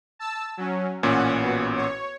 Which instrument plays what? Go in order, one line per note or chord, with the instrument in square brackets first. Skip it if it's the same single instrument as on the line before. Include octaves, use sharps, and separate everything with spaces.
[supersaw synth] A5 E6
F#3 C#4
[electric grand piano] A1 A#2 C#4 [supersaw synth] F#5
[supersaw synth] B3 F#4
C#5